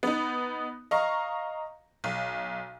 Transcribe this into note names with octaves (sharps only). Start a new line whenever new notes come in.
B3 D#4
D#5 F5 A#5 C#6
B1